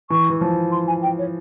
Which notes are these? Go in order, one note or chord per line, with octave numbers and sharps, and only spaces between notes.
E3 C#6
E3
F3
C6
G#5
G5
C#5